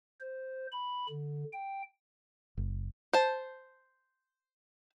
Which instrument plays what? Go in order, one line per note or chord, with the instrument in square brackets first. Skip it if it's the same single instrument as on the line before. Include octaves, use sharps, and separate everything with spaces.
[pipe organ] C5
B5
D3
G5
[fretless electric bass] F#1
[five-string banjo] C5 A5